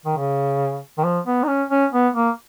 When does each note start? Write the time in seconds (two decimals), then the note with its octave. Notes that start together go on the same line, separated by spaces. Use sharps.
0.05 D#3
0.17 C#3
0.98 D#3
1.04 F3
1.26 B3
1.43 D#4
1.48 C#4
1.70 C#4
1.93 B3
2.15 A#3